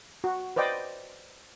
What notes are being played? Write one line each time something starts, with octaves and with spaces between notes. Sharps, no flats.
F#4
B4 C5 D5 D#5 G5